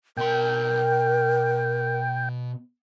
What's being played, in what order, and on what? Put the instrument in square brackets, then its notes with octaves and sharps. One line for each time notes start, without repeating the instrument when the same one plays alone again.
[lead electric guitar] B2 C6 [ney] A#4 [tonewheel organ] G5